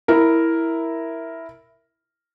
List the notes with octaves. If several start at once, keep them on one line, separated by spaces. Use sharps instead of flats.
E4 A#4